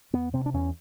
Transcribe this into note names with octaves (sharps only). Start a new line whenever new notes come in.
E2 B3
C3 C4
D4
E2 C#4